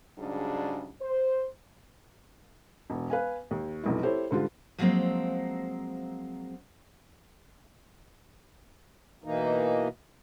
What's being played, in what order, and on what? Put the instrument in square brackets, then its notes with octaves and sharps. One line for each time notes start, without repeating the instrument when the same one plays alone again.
[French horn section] G#2 C#3 F#3 G3 D4
C5
[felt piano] E1
B4 F5 G#5
D#2
F1 B1 E4
E4 G4 A4 C5 C#5
G#2 D3 G3 F4
[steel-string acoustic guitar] F3 F#3 G#3 A#3 C4
[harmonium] B2 E3 A#3 D#4